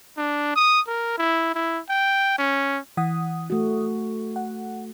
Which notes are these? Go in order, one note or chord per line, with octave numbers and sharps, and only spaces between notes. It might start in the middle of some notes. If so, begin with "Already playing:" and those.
D4
D#6
A#4
E4
E4
G5
C#4
E3 F#5 D#6
A3 F#4
F#5